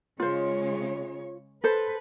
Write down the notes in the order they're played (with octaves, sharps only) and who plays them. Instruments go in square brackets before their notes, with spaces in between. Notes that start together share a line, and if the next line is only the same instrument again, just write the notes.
[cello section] C#3 G#3 C#5 [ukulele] F4 C5
[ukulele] A4 C5 [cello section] B4